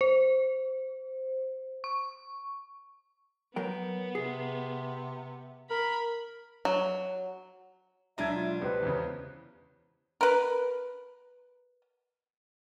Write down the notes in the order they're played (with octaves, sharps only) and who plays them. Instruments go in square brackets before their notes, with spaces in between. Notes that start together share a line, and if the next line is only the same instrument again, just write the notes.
[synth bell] C5
C#6
[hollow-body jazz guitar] F#3 A#4 G5 [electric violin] B3
[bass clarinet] C3 [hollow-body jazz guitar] G#4
[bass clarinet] A#4 [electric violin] B5
[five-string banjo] F#3
[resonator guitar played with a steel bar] B2 D4 [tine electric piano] F#3 G#3 E4 [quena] E5 [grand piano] A#5 G#6
[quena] F4
[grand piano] C#2 [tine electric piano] G4 C5 [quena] B4
[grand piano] E2 C#3
[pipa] A#4 B4